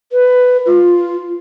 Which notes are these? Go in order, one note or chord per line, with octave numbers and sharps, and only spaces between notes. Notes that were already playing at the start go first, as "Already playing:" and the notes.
B4
F4